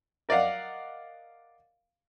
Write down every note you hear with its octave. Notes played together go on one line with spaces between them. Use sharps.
A#4 D5 D#5 F5 F#5